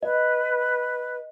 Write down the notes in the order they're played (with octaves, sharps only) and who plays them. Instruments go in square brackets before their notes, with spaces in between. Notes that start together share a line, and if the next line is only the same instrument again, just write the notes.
[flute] B4 [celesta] D#5